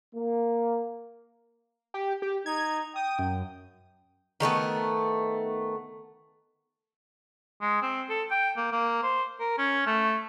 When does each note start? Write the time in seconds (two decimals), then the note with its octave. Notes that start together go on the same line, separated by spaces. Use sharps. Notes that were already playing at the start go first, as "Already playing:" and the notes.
0.15 A#3
1.94 G4
2.22 G4
2.46 D#4 G#6
2.96 G5 D#6
3.19 F#2
4.40 D#3 G3 A3 B3
7.61 G#3
7.82 C4
8.09 A4
8.31 G5
8.57 A#3
8.72 A#3
9.03 C5
9.40 A#4
9.58 C#4
9.87 A3